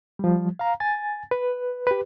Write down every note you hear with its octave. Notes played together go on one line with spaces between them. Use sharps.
F3 G3
F5 A#5
G#5 A6
B4
G4 B4